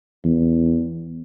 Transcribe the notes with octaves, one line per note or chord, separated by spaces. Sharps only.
E2